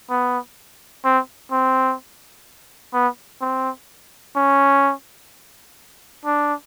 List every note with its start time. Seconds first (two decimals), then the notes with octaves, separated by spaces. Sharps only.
0.10 B3
1.05 C4
1.52 C4
2.94 B3
3.42 C4
4.36 C#4
6.25 D4